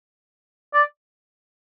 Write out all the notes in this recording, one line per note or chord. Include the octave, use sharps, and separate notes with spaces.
D5